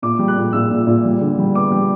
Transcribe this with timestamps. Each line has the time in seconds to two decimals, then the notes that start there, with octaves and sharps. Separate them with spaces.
0.02 A#2 D6
0.19 G3
0.28 F#6
0.37 A#2
0.53 A#2 E6
0.71 A#2
0.87 A#2
1.04 G3
1.21 D3
1.38 G3
1.55 B3 D6
1.71 G3